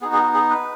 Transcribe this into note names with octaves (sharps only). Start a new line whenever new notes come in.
B3 D#4 F#4 G#4
G#4
F#4
G#4
B4